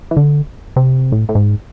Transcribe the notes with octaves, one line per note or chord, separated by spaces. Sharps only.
E3
D3
C3
A2
A2
G#2